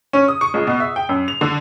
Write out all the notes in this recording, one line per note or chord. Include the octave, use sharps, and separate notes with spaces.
C#4
D#6
C#6
C#2
B2
E5
G5
F#2
F7
D3